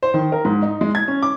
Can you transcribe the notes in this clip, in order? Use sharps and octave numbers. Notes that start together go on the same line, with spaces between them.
C5
D#3
A#4
G#2
D#4
G#3
G#6
C#4
D6